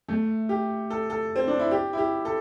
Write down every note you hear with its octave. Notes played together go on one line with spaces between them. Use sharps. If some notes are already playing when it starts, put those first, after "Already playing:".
A3
G4
A4
A4
C4
D4
E4
G4
E4
G4
A4